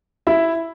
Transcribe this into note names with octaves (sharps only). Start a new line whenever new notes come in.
E4 E5